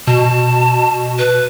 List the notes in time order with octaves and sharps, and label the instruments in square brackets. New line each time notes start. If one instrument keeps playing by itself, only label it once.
[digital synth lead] B2 [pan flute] A5
[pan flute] B4